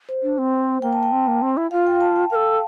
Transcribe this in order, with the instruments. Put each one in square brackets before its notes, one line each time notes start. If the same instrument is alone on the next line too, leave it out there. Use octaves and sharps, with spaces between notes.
[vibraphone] C5
[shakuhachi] D4
C4
[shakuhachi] A#3 [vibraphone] G5
[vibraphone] A5
G5
[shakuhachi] C4
A#3
C4
E4
[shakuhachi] F4 [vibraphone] F5
[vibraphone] G5
A5
G5
[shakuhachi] A#4 [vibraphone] F5
[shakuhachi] A4